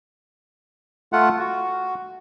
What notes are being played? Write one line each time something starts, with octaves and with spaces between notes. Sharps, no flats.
A3 F4 F#5
F#4